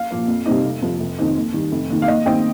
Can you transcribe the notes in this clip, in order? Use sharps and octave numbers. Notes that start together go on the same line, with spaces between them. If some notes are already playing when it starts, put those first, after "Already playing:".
Already playing: F5
A#2 F3 A#3
F2
C3 G3 C4 D#4
F1
F2 C3 F3
F1
F2 D#3 C4 D#4
D#2
D#3 G3
F1
D#2 D#3
F5
D#2 D#5
D#3 C4 D#4 D#5 G5